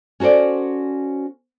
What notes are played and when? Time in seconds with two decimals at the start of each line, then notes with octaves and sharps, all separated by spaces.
0.20 C#4 F#4 A4 C5 D5